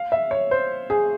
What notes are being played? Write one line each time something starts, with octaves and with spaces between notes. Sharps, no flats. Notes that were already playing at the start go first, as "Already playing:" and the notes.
Already playing: F5
E5
C#5
C5
G#4